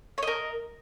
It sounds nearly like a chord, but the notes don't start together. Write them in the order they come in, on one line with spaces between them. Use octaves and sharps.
C#5 D#5 A#4